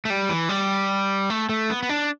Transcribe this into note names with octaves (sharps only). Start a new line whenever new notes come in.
A3
G3
E3
G3
A3
A3
B3
B3
D4